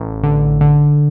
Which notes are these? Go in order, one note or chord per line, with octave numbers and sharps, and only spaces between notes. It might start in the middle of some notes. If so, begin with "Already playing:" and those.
Already playing: A1
D3
D3